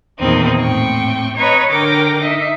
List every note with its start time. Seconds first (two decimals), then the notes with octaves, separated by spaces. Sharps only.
0.20 E2 A#2 D#3 A#3 C4 D#4
0.61 A2 C4 G5 C#6
1.37 B4 C#5 D#5 A#5 G#6
1.70 D3 A#4 G5 D6 A#6
2.21 D#4 D#5 E5